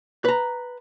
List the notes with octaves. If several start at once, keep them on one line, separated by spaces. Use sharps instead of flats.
B4 A#5